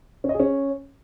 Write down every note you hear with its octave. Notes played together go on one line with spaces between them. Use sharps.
C#4
D#5
G#4
C#4